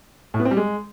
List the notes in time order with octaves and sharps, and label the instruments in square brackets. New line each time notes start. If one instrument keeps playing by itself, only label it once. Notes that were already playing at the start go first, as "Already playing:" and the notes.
[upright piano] A2
B3
C4
G3
G#3